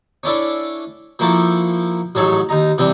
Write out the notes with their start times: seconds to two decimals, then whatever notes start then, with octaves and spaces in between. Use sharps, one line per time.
0.23 C#4 D4 E4 A4
1.19 F3 A#3 E4 F#4 A4
2.15 A1 G#2 F#3 A4 C#5
2.49 D#2 D#4 A#5
2.78 C3 E3 G3 C4